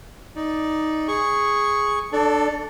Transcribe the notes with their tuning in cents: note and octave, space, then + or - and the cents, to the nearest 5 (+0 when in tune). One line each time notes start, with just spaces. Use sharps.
D#4 +5 D5 +0
G#4 -5 C#6 +0
D4 +25 A4 +0 D5 -35